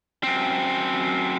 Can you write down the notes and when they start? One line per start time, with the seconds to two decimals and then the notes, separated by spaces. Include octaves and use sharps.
0.23 F#2 C4